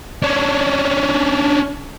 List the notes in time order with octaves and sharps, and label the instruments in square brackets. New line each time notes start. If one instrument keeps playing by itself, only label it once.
[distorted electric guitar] C#4 D4